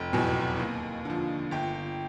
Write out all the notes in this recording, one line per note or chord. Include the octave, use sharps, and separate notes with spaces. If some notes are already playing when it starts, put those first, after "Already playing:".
Already playing: F1 G5
E2 B2 F#3 G#5
D#2
D3 F3
G1 G5